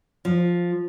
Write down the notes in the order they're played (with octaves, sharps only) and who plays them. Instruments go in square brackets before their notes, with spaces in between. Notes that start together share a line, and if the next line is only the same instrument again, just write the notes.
[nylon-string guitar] F3